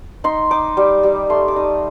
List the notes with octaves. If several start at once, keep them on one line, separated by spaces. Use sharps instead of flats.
D#4 C6
D#4 D6
G3
G3
A3 C6
D6
D#4 D#6